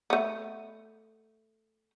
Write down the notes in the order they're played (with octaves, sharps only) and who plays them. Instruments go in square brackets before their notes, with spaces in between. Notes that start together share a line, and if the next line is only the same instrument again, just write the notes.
[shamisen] A3 B3